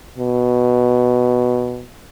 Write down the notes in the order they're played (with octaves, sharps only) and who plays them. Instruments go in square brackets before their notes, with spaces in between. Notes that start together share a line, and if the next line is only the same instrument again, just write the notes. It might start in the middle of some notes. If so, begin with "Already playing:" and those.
[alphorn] B2